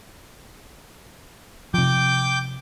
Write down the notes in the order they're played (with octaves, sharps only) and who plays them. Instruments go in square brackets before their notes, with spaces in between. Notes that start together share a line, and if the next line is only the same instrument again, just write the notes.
[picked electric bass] C3 F3 [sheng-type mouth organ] G5 D6 G6